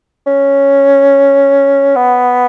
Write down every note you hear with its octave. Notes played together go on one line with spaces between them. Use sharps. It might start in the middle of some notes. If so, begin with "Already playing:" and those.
C#4
B3